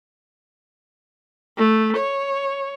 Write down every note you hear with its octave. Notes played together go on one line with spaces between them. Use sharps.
A3
C#5